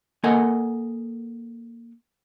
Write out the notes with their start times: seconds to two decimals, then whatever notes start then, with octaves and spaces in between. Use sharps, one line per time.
0.24 A#3 A4 A#4 D#5 F#5 G#5